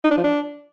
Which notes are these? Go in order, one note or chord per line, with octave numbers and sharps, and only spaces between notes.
D#4
D4
F3
D4